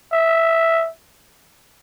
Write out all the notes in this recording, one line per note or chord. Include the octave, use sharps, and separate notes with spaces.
E5